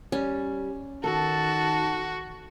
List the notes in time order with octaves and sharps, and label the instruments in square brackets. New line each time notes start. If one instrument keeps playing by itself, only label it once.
[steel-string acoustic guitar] G3 [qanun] C#4
[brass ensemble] D#3 A5 [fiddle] F#4 [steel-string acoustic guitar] A4